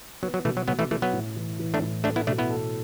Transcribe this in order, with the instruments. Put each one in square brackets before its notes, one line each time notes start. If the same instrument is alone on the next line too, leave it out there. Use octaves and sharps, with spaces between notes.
[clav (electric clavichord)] F#3 [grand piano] B3
[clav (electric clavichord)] F#3
[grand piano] B2 [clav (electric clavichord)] E3 A3
[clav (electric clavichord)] F#3
[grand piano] B2 [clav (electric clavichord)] F#3 B3
[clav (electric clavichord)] E3 A3
[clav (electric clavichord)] E3 A3 [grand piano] E4
[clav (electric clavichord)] F#3 B3
[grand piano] A2
E3
E3
[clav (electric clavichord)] A3 D4
[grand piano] A2
[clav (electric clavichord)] A3 D4 [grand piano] A4
[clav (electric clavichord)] B3 E4
[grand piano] B2 [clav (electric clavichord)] A3 D4
[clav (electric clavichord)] B3 E4
[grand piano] A4